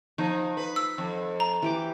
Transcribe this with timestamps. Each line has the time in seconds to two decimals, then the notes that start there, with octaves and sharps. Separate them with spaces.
0.18 F3 D#4
0.57 B4
0.76 E6
0.98 F2
1.40 A#5
1.62 E3 G4 D6